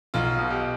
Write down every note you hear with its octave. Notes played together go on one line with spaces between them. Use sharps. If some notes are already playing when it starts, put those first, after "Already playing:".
B1 F4
B2
G4